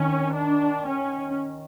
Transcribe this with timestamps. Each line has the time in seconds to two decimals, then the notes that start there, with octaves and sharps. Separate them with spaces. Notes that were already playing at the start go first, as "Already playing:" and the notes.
Already playing: D#3 C#4
0.34 D4
0.86 C#4